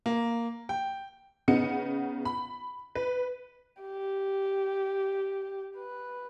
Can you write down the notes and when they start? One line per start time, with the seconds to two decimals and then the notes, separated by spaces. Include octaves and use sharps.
0.06 A#3
0.69 G5
1.48 C#3 B3 D#4 C#7
2.25 B5
2.95 B4
3.82 G4
5.78 B4